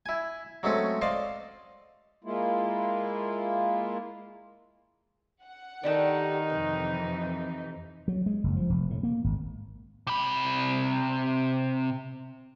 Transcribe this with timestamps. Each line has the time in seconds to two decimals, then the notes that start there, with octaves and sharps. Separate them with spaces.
0.06 E4 G#5
0.63 F#3 G#3 A3 C4 C#4
1.02 C5 D5 D#5 F5 C6
2.24 G#3 A#3 E4 F4
5.43 F#5
5.83 D#3 D4 D#4 G4 A4
6.50 F2 C3 E3 B4
8.08 F#3
8.26 G#3
8.44 F#1
8.57 F3
8.70 F1
8.90 A2
9.03 A#3
9.24 G#1
10.07 C3 B5